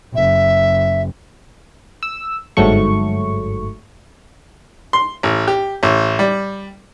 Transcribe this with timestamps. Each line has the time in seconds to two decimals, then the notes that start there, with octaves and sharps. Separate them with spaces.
0.15 F#1 E5
2.03 E6
2.57 G1 G#2 F#3 A3 C#6
4.93 C6
5.23 A1
5.47 G4
5.83 A1
6.19 G3